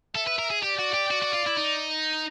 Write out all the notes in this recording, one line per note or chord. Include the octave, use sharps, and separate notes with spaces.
A4 E5
B4
A#4
G#4
G4 D5
F#4
G4
F#4
F#4
F4
E4
D#4